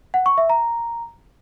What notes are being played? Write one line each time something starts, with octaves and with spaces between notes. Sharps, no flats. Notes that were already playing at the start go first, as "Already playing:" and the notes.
F#5
C#6
E5
A#5